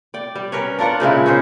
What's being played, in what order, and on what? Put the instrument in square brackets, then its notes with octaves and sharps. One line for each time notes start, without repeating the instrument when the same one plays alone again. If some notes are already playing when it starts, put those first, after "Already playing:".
[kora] D5 G5
G3
C#4 A#4 B4 C#5
D4 F4 A#4 F#5
A#2 C#3 G#3 E4
C#4 D#4 G#4 C5